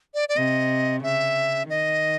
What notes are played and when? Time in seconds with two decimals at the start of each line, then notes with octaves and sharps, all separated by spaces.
0.14 D5
0.29 D5
0.37 C3 D#5
1.03 C#3 E5
1.69 D#3 D#5